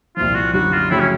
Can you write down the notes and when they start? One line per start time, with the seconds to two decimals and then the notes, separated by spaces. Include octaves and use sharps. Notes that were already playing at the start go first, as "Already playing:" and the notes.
0.17 C2 A#2 F3 F4
0.35 F#4
0.53 F#2 D3 G3 F#4
0.73 F4
0.90 F2 C#3 F#3 A3 E4
1.00 C#4